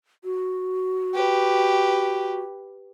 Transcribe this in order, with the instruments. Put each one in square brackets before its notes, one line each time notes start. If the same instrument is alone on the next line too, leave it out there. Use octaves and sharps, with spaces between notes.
[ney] F#4
[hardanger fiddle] G4 B4